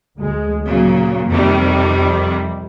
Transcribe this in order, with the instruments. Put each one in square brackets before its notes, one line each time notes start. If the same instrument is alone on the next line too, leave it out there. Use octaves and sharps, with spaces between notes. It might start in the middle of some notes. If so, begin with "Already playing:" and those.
[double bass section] D2 G#3
[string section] A#2 C#3 [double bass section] F#3 A#3
[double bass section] F2 [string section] C3 D#3 G3